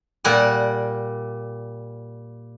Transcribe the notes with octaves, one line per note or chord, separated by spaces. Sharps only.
A#2 G3 F#5 G#5